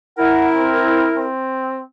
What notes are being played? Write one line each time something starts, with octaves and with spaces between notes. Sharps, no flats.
E4 A#4 F#5
C4
C4